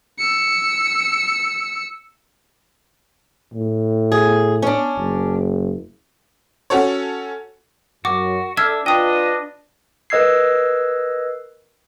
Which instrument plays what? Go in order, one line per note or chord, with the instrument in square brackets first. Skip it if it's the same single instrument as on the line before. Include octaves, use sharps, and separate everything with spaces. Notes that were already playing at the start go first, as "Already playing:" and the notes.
[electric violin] E6 C#7
[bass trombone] A2
[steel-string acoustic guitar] G#4
C#4 D4
[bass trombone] F#1
[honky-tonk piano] C#4 F#4 A4 C#5
[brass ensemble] F#2 [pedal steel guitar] F#4 [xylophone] D6
[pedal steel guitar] D4 E5 [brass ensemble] A4 D5 [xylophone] E6 F6 G#6
[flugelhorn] D4 [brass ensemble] F4 B4 [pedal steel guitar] D#5 [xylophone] G5 D#6
[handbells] A#4 B4 D#5 E6 G#6 C7